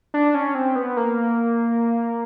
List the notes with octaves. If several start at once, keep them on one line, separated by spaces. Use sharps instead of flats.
D4
C#4
C4
B3
A#3